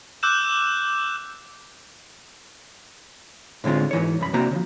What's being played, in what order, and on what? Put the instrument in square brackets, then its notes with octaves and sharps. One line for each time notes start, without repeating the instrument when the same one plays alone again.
[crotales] D6 E6 F#6 G6 E7
[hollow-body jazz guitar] A2 D3 G#3 C4 F4
G#2 E3 C#5
C2 F#2 B5
C3 A#3 C4 D4 F#4 A#5
C#3 F3